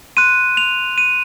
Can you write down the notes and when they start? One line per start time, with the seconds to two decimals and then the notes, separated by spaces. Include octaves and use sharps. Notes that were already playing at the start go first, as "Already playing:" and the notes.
0.17 C6 F#6 D#7
0.57 F7
0.98 D#7